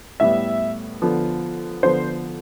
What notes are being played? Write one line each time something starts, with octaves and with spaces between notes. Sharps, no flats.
A2 G3 B3 E5
D3 F3 B3
D3 F3 B3 C5